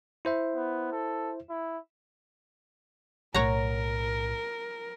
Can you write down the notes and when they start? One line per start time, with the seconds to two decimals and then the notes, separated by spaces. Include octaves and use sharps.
0.25 E4 C5 E5
0.55 B3
0.92 A4
1.50 E4
3.34 B1 A2 A#4 C#5 F#5 A#5